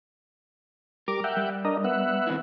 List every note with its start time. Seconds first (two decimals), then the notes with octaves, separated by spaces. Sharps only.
1.08 G3 A#4 D6
1.24 E5 F#5 G5
1.37 G3
1.65 D4 A#4 D#5
1.84 B3 E5 F#5
2.27 D#3 C4 E4